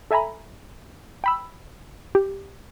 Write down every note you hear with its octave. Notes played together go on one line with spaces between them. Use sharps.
A4 E5 G#5 A#5 B5
G5 B5 E6
G4